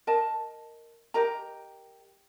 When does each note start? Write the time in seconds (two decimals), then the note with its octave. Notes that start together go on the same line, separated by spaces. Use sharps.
0.07 A#4 D#5 A5
1.14 G4 A#4 D#5 A#5